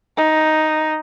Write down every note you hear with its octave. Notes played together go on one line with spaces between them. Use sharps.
D#4